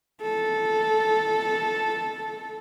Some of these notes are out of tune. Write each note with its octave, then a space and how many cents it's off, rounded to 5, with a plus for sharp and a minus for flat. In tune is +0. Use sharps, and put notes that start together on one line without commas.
A4 -10